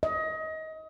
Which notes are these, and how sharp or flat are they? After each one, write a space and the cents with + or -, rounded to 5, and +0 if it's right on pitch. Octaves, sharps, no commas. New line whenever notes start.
D#5 +25